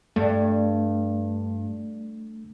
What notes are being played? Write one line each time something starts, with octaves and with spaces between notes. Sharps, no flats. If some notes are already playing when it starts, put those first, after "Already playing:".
G2 A3